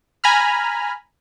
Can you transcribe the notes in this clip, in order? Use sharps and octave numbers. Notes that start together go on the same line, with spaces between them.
G#5 A#5 B5 F6